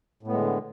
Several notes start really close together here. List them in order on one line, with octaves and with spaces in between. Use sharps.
A2 B3 G#3 D3